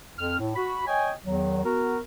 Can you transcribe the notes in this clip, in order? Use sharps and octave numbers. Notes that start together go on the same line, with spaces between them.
F2 F6
A2
F#4 B5
C#5 D#5 G5 G#5
E2 D#3 F#3
B3 F#4 A#4